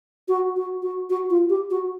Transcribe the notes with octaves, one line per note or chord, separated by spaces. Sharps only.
F#4
F#4
F#4
F#4
F4
G4
F#4